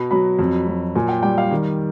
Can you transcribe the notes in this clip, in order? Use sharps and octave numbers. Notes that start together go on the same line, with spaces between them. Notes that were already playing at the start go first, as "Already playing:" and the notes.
Already playing: B2 B5
F#3 B5
F2
F#3
A#2 G#5
G5
G3 G5
F5
D#3